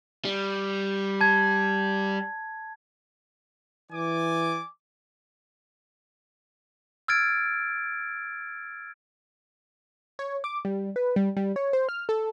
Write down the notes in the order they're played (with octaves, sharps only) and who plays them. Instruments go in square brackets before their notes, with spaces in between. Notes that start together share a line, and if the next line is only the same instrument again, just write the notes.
[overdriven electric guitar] G3
[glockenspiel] A5 G#6
[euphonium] E3 [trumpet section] D5 G#5 D6
[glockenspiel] E6 F6 G#6 A6 D7
[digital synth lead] C#5
D6
G3
B4
G3
G3
C#5
C5
F6
A4